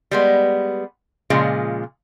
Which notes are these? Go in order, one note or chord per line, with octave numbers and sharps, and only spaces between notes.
G3 G#3 B3
A#2 C#3 F3 G#3